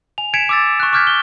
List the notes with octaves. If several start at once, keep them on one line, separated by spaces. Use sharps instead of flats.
G#5 F7
G#5 G#6 B6 C#7 D7 E7
D6 E6 A6
C#6 F#6
C#6 D6 F6 G6 G#6 B6
G7